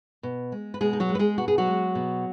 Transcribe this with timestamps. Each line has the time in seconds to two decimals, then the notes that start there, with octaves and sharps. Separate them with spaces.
0.23 B2
0.52 G#3
0.74 B4
0.81 B2 G#3 G#4
0.93 D#4
1.00 F#3 F#4
1.09 G#3
1.15 B4
1.19 G#3 G#4
1.38 B2 F#4
1.48 G#4
1.58 F#3 F#4
1.67 G#3
1.95 B2